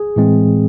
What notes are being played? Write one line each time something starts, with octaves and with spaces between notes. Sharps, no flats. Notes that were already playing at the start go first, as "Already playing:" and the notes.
Already playing: G#4
A2 E3 G#3 C4